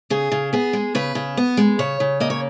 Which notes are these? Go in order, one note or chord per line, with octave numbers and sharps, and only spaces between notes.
C#3 G#4
C#3
B3 G#4
G#3
C#3 B4
C#3
B3
G#3
C#3 C#5
C#3
A#3 D#5
C#5